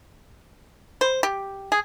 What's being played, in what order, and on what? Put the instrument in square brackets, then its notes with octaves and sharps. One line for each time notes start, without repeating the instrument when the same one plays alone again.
[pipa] C5
G4
G#4